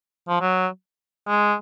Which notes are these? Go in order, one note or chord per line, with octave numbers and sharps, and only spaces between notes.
F3
F#3
G#3